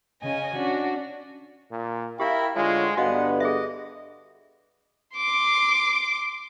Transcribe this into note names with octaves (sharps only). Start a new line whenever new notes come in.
C#3 C#4 D#5 G#5
C#4 D4 F#4
A#2
E4 G4 A#4 F5 G5 B5
D2 D3 G#3 F4 C#5 G#5
G2 D3 B3 F#4 D#5 F5 F#5
G#4 D#5 E5
C6 D6